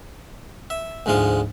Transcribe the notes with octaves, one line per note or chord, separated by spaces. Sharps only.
E5
D2 G#2 F3 G#3 F5